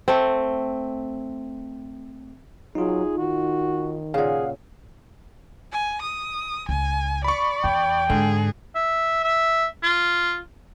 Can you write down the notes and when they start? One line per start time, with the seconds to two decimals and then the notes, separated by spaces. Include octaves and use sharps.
0.08 A3 C4
2.75 F#3 D#4 F4 G#4
3.17 D#3 F#4
4.14 A#2 C#3 G#4 F5 F#5
5.72 G#5
6.02 D#6
6.69 C#2 G#5
7.24 D5 B5 C#6
7.64 E2 G5
8.10 G#2 D3 G#4
8.75 E5
9.23 E5
9.83 F4